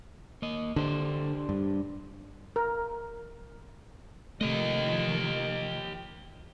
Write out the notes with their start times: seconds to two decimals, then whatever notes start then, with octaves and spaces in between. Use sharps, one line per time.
0.42 A#3 D#5
0.76 D3 D4 G4 C5
1.49 G2
2.56 A#4
4.41 C3 D#3 F3 A3 G4 D#5